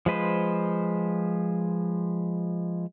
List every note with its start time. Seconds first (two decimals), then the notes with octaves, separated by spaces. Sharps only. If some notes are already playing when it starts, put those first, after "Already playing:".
0.06 F3 G#3 B4 C5